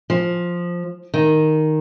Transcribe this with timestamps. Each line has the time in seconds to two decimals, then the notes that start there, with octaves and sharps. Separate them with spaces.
0.10 F3
1.14 D#3